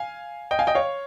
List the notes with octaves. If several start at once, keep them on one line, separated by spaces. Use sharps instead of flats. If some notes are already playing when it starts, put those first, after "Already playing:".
Already playing: F5 G#5
D#5 G5
F5 G#5
D#5 G5
C#5 F5